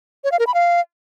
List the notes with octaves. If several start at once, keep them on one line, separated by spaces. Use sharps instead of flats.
C#5
F5
A#4
B5
F5